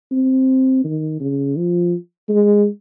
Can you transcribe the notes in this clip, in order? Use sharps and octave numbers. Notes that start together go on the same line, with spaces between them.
C4
D#3
C#3
F3
G#3